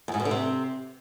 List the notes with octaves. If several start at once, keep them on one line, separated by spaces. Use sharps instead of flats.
E2
G#2
B2
D3
C3